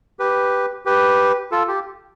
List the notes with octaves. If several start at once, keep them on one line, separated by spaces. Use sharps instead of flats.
G4 B4
G4 B4
F4 A4
G4